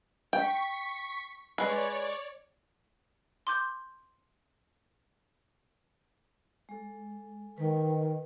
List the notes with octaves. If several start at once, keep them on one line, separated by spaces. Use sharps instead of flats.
G5 C#6 B6
G#3 B4 C#5 D5
C6 D6 G6
G#3 A4
D#3 B4